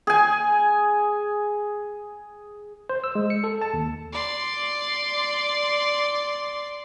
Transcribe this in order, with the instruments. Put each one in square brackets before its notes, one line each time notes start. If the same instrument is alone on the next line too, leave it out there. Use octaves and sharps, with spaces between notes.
[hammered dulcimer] G#4 G#5
[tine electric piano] C5
E6
G#3
C#7
A4
A5
D#2
[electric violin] D5 C6